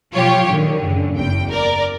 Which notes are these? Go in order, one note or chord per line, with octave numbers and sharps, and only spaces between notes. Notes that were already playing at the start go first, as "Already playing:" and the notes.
B2 F3 F#3 F4 G4 C#5
A#2 D3 D#3
F#2 A2 C#3
F#1 E2 G5
A#4 D5